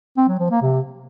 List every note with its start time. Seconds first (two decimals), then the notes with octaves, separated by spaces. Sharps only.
0.17 C4
0.28 F#3
0.40 F3
0.51 A#3
0.62 C3